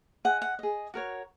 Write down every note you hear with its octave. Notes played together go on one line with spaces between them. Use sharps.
G#4 D#5 F#5
F#5
G#4 D#5
F#4 A#4 C#5